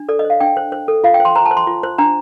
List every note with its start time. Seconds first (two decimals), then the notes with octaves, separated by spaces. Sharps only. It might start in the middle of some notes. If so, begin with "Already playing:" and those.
Already playing: D4
0.09 A4 D5
0.19 D#5
0.24 C5
0.30 F5
0.41 D4 G5
0.57 C5
0.72 C5
0.88 A4
1.04 F4 F5
1.14 G5
1.20 C5
1.25 C6
1.35 C5 A#5
1.46 A5
1.51 C5
1.57 C6
1.67 F4
1.83 C5
1.98 D4 A#5